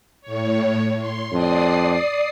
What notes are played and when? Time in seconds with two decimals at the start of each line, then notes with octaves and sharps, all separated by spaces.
0.21 A2 C#5
0.99 C6
1.33 F2 D5 D#6 C7